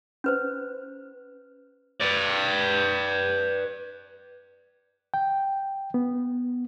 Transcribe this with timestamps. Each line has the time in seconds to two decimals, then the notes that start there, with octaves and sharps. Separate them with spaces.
0.24 C#4 B4 C5
2.01 B4 D5
5.14 G5
5.94 B3